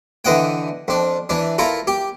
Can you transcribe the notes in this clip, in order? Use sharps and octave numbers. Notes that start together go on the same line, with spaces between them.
D3 E3 D#5 F#5 G5
F2 D4
E3 D4
E4 F4 A4 A#4
G4